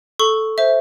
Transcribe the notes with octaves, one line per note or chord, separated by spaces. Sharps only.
A4 C#6
C5 E5